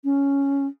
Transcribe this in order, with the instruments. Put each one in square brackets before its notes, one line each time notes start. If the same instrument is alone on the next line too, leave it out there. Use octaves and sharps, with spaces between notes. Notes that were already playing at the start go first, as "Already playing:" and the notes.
[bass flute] C#4